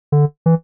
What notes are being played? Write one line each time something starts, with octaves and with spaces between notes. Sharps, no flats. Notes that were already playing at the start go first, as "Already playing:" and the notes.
D3
E3